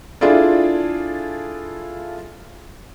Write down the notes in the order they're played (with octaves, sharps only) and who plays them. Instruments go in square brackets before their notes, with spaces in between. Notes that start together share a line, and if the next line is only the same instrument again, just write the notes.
[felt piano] D4 E4 F4 G#4 A4 D5